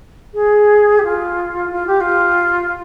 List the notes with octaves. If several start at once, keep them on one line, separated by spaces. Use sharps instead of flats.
G#4
G4
F4
F4
G4
F4